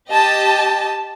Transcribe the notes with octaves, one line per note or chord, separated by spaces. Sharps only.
G4 D#5 A5